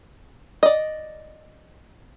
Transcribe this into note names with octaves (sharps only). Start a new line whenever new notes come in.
D5 D#5